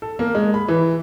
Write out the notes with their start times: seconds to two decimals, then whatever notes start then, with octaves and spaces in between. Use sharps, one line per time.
0.02 A4
0.19 A#3
0.35 G#3
0.54 B5
0.68 E3